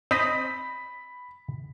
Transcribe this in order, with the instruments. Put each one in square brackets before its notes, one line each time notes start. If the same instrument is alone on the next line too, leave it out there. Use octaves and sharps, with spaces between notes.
[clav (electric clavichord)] C4 [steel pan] D#5 [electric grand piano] B5 B6